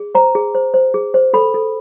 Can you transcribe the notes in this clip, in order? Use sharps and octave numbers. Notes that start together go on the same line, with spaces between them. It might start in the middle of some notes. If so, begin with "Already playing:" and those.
Already playing: G#4
C5 A#5
G#4
C5
C5
G#4
C5
A4 B5
A4